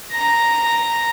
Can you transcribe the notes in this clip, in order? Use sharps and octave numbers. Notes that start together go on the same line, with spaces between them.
A#5 A#6